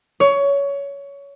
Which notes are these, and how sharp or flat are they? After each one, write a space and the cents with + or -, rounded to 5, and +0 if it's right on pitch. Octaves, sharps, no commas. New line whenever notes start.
C#5 +20